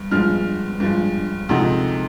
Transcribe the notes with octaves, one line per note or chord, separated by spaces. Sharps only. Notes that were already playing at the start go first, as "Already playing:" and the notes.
Already playing: G2
G2 F3 G#3 F6
G2 F3 G#3
D2 C3 F3 G#3 D#4